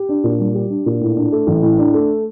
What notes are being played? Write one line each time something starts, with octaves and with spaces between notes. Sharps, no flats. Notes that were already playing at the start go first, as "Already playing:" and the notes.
Already playing: G4
D4
A#2
G3
G4
D4
A#2
A2
D4
A3
A1
A2
D4
A3